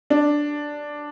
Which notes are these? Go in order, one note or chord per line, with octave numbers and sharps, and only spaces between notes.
D4